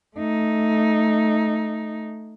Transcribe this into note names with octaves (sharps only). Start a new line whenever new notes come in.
A3 D#4